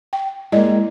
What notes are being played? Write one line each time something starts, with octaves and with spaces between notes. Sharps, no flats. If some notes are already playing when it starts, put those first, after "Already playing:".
G5
G#3 A#3 E4 D5 D#5